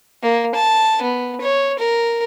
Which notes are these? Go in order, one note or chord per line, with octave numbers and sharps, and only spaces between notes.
A#3
A5
B3
C#5
A#4